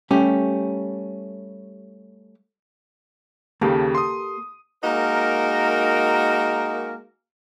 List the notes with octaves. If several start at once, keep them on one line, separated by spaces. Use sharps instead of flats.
G3 A3 C#4 G4
D#2 C#3 A#3 G4 A4
C6 D#6
G#3 A#3 D#4 F#4 A#4